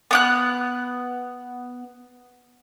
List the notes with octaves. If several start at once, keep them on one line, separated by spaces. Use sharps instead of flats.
B3 D6 F#6